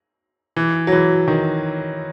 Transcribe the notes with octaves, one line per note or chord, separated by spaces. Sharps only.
E3
F#3
E3
D#3